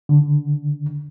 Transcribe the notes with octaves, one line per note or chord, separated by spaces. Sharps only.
D3